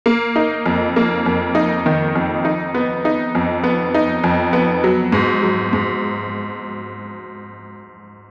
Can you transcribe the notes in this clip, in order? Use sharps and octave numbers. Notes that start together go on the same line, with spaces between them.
A#3
D#4
F2
A#3
F2
D#4
D#3
F2
D#4
B3
D#4
F2
B3
D#4
F2
B3
F#3
G#2
F#3
G#2